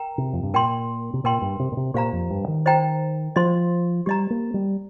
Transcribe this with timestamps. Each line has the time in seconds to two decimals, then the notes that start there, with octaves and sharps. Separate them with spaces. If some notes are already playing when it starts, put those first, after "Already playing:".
Already playing: A#4 G5 A#5
0.18 C3
0.33 F2
0.43 G2
0.54 A#2 A#4 G5 C6
1.14 C3
1.24 A#2 A#4 G5 C6
1.42 G2
1.60 C3
1.72 A#2
1.77 C3
1.94 A#2 G4 C5 F5 A#5
2.13 F2
2.30 G2
2.48 D#3
2.66 C5 D#5 G5 A#5
3.36 F3 C5 D#5 C6
4.06 G3 G4 D#5 A#5
4.30 A#3
4.54 G3